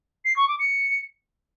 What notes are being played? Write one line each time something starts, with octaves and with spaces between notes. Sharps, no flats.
C7
C#6
D6
C#7